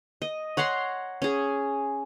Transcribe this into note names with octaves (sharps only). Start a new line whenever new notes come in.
D#5
C#5 F#5 A#5 C6
C#4 G#4